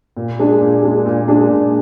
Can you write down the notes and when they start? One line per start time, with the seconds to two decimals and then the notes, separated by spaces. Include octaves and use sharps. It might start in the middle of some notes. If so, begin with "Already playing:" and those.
0.17 A#2
0.39 G#3 D4 G#4
0.61 A#2
0.83 G#3 D4 G#4
1.06 A#2
1.28 G#3 D4 G#4
1.49 A#2